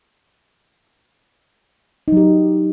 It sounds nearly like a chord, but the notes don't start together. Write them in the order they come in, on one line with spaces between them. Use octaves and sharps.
D#4 F#3 G4